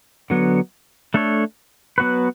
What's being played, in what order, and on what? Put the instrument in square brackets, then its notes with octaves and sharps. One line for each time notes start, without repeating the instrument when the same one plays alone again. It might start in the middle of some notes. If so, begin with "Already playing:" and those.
[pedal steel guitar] D3 F#3 B3
A3 D4 A4 C#5
F#3 B3 F#4 B4